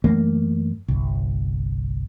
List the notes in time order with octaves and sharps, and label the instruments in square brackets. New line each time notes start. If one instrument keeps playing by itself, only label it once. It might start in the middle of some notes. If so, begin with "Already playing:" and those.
[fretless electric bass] F#2 E3 A3 A#3
G1 C2